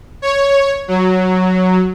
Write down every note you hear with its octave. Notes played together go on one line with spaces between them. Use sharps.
C#5
F#3